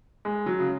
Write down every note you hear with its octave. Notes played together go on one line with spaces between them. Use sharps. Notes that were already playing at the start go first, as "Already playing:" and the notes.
G#3
F#3
C#3